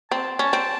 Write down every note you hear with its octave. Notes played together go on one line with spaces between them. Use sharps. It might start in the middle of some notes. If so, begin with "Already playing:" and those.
C4 A5
C#4 A5
C4